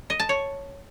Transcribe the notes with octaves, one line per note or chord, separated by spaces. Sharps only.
D#5
A5
C#5